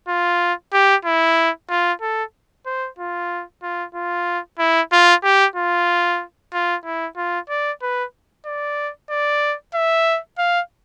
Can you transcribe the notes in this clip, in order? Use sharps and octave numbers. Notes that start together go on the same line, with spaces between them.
F4
G4
E4
F4
A4
C5
F4
F4
F4
E4
F4
G4
F4
F4
E4
F4
D5
B4
D5
D5
E5
F5